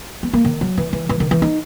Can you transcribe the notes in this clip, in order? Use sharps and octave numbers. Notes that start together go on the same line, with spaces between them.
B3
A#3
D#3
F#3
E3
E3
E3
D#3
E3
D#4